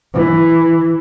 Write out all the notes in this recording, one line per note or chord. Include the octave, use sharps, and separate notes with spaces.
E3